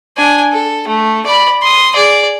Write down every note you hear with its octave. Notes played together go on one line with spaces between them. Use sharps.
D4 G#5
A4
A3
D5 B5
C6 D#6
G#4 D5